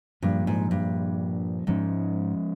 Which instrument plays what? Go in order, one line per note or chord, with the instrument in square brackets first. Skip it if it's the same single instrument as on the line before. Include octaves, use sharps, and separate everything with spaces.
[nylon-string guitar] G2 [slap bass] A#2 F3 A#3
[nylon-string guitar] G#2
G2
[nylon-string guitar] G#2 [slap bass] F3 G#3 C#4